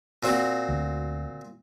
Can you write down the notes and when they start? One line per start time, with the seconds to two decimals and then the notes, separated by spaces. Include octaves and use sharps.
0.23 A#2 C4 F#4
0.69 D2